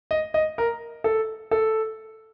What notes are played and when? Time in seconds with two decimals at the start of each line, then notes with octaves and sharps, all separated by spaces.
0.11 D#5
0.34 D#5
0.58 A#4
1.04 A4
1.51 A4